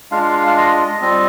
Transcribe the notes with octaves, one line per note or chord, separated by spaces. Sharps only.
G#3 D4 F4 F5
F5
D#5
G3 C4 F4 D#5